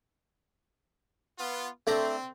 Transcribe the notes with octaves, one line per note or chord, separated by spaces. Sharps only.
B3 F4
A3 C4 D4 A#5